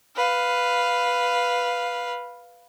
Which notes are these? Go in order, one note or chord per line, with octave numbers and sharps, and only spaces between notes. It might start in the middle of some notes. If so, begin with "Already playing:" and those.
B4 F5